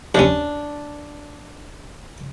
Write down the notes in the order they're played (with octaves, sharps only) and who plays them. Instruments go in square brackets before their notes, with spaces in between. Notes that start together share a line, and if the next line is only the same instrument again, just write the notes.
[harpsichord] D#2 C#4 [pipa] D4